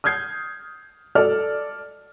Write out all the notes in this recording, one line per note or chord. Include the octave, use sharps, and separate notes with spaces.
D#6 F6 G6 G#6 C7
A4 D5 F6